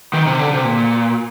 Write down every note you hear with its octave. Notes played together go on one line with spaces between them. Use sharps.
D#3
C3
D3
C3
A#2